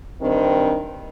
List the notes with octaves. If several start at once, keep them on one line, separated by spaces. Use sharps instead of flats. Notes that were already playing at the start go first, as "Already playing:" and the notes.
G2 D#3 C4